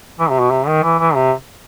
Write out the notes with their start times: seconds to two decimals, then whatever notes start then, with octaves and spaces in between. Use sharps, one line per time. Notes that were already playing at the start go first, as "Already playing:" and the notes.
0.20 E3
0.30 C3
0.40 B2
0.51 C3
0.67 D#3
0.83 E3
0.99 E3
1.15 C3